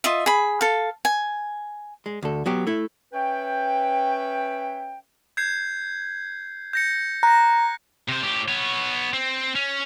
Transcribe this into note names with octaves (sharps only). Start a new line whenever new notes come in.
F4 D#5 E5
G#4 B5
A4 F5
G#5
G#3
D2 A4
F#3 B3 G4
A3 E4
C#4 B4 C#5 E5 G5
G6 G#6 C7
G6 A#6 C#7
A#5 F#6 A#6
C3 C5
A2 G4
B3 C#5
C4
C#4